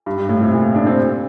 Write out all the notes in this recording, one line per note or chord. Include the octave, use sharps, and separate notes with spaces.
G2
G2
A2
C3
A#2
D4
C4